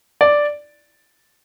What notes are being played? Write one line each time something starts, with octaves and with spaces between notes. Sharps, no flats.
D5